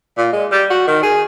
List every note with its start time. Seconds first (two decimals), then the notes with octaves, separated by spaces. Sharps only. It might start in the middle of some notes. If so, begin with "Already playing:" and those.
0.17 A#2
0.33 G#3
0.52 G3
0.70 F#4
0.88 D#3
1.03 G#4